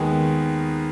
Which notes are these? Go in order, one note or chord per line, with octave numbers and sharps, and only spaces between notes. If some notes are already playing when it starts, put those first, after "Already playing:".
Already playing: D#2 D#3 G#3 B3